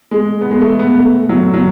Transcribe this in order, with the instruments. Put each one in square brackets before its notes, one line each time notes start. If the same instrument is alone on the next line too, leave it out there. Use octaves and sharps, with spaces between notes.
[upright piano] G#3
B3
G#3
A3
B3
A3
F#3
F#3